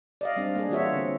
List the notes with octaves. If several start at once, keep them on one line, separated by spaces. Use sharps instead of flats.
D5 D#5 F5
G3 C4 D4
A#3 D4 G#4
E3 A#3 F4 F#4 C#5 E5
D3 C4